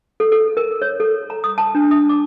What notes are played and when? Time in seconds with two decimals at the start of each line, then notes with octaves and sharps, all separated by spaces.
0.20 A4
0.32 A4
0.57 A#4
0.82 C#5
1.00 A4
1.30 A#5
1.44 D#6
1.58 A5
1.75 D4
1.91 D#6
2.09 D6